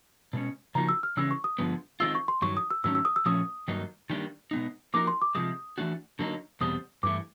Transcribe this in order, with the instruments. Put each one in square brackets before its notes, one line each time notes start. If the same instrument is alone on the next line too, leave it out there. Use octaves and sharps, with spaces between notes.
[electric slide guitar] B2 G#3 C#4
[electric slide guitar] C#3 F3 A#3 D#4 F#4 [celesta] A#5
[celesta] E6
F6
[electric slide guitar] C#3 E3 G#3 C#4 [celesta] E6
[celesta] C#6
D#6
[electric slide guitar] G2 D3 F3 G#3 B3
[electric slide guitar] D#3 G#3 C4 F4 [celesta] E6
[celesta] C#6
C6
[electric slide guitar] G2 D#3 F#3 [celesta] C#6
[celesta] D#6
E6
[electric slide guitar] G#2 D#3 F#3 A3 C#4 [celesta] E6
[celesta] E6
D#6
E6
[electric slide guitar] A#2 F3 A3 C#4 [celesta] D#6
[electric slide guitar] G2 D#3 F#3 A#3 D#4
D#3 G3 A#3 D4 G4
B2 G#3 B3 D#4
[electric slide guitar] F3 A#3 D#4 F#4 A#4 [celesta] D6
[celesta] C6
D6
[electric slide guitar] C3 F3 G#3 [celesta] D#6
[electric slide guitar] E3 A3 D4 F#4
D3 F#3 A#3 D#4
[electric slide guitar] E2 B2 G3 C4 [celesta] D#6
[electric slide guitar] G2 E3 A3 [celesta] D6